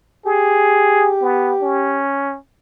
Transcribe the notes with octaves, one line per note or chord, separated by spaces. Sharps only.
G4 G#4
B3
C#4